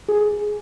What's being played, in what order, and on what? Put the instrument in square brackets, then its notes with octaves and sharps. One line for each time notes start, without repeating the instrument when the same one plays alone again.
[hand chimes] G#4